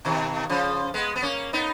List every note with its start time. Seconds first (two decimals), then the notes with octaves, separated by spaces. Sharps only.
0.05 B2 D#3
0.49 C#3 F3
0.94 G#3 B3
1.16 B3
1.22 A#3 C#4
1.53 B3 D#4